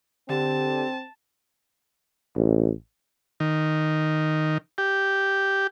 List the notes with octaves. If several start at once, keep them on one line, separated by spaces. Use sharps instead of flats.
D3 C4 G4 A5
A1
D#3
G4